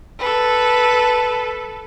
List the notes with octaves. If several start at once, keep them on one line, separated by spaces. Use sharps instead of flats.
A4 B4